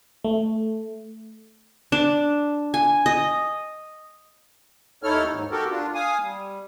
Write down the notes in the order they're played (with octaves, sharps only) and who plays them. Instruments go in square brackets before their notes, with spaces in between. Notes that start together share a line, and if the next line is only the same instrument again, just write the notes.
[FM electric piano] A3
[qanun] D4
G#5
D#5
[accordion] D#2 D#4 E4 A4 C#5 F6
G#2
F#4 G4 A4 A#4
D4 F4
F5 G#5 D#6
G3